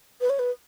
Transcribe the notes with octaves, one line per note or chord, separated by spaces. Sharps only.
B4
C#5
B4